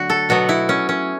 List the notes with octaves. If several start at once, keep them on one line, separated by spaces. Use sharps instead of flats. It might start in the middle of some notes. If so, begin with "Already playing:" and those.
Already playing: D3 F#3 A3 F#4
A4
B2 F#3 B3 F#4
E4
C#4
C#4